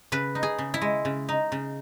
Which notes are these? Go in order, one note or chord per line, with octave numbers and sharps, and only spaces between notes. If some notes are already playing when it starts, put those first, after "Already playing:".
C#3 B4
D#4
G#4
C#3
E4
G#3
C#3
D#4
C#3